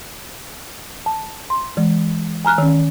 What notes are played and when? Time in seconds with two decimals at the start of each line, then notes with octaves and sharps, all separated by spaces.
1.06 A5
1.50 C6
1.77 E3 G#3
2.45 G#5 A#5 F6 F#6
2.58 D#3 C#4